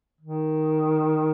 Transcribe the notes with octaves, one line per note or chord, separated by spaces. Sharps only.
D#3